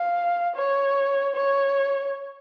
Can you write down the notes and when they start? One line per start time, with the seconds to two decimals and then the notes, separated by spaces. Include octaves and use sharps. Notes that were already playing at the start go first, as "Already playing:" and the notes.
Already playing: F5
0.55 C#5
1.35 C#5